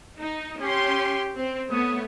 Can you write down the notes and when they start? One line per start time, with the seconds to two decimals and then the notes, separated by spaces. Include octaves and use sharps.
0.19 D#4
0.61 C#4 G4 C6
1.36 C4
1.70 A3 B3 C#5 D#6